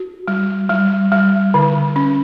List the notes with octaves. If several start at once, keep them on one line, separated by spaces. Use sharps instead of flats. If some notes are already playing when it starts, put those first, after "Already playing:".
Already playing: F#4
G3
G3
G3
D3
C#4